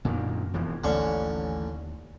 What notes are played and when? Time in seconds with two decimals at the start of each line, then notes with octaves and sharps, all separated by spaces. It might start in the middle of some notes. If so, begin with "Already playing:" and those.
0.05 F#2 A#2 D3 D#3
0.54 E1 E3 F3
0.84 A1 D#2 D3 C#4 C#6